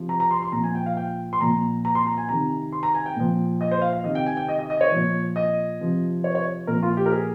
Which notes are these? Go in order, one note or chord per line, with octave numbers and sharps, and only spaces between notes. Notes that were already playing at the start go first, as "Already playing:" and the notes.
Already playing: C3 F3
A#5
A#5
C6
C6
A#2 F3 A#5
G#5
G5
F5
G5
C6
A#2 F3 A#5
A#5
C6
A#5
G#5
C3 D#3 A#5
C6
A#5
G#5
G5
A#2 F3
D#5
C5
F5
F5
C3 D#3 D#5
G5
G#5
G5
D#5
D#5
D#5
C#5
A#2 F3
D#5
C3 F3
C#5
C#5
A#2 F3 A#4
F4
G4
A#4
G#4